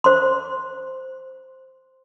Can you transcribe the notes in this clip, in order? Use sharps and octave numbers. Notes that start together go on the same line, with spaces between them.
C5 C6